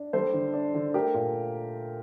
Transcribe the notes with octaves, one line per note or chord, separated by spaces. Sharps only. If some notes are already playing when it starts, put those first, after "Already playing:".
Already playing: D4
G3 A4 C5
D3
D4
D3
A3 G4 A#4
A#2